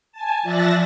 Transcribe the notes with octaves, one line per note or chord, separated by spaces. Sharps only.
G#5 A5
F3 D5 E5 F#6 A6 A#6